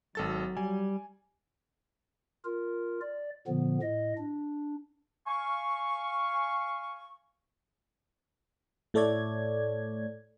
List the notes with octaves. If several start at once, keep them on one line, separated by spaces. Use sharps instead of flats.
G#1 F#3 A4 A6
G3 G#5
F4 A#4
D5
A#2 D3 F3 B3
A2 D#5
D4
F5 G#5 C#6
A2 A3 A4 C#5 D5 G#6